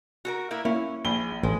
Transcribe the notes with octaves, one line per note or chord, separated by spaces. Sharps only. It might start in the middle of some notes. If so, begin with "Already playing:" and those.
F#4 A4 A#4
A#3 E4 A#4
A#3 C#4 E4
A#1 G#4 B5 G7
A1 G#3